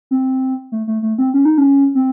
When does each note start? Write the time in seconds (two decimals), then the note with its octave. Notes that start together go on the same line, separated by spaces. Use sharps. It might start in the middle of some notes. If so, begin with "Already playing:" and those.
0.11 C4
0.72 A3
0.87 A3
1.02 A3
1.18 C4
1.34 C#4
1.45 D#4
1.58 C#4
1.95 C4